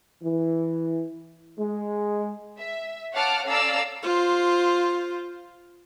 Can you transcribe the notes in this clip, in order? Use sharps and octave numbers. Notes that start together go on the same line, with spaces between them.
E3
G#3
E5
C#5 F5 F#5 A5 D6 F6
C#4 A4 D5 F5 A#5 E6
F4 C5